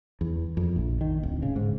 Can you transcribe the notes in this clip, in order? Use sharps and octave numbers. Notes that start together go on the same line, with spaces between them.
E2
F2
A#1
D#3
D1
C#3
G#2